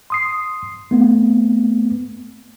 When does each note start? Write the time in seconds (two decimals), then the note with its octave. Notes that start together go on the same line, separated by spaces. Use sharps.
0.10 C6 D#6 C7
0.91 A3 B3 C4